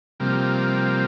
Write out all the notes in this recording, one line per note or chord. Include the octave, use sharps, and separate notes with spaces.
C3 F3 G3 A#3